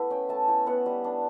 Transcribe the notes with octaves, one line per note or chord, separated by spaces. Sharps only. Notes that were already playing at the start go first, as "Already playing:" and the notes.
Already playing: A3 B3 E4
C#4 G5
A3 A5
E4 G5
B3 F#5
G3
D4